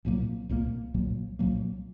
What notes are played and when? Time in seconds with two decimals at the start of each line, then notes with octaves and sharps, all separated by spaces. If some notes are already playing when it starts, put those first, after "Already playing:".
0.05 C2 A#2 F#3 A#3
0.49 C2 A#2 F#3 A#3
0.94 C2 A#2 F#3 A#3
1.39 C2 A#2 F#3 A#3